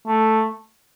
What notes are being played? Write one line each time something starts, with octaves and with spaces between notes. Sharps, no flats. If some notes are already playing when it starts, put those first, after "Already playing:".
A3